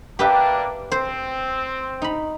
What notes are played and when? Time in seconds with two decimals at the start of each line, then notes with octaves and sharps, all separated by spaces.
0.19 G3 A#3 D4 G4 B4 E5
0.92 C4 C5
2.02 D#4 B5